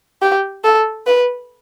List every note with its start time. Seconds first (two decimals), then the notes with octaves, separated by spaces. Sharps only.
0.22 G4
0.64 A4
1.06 B4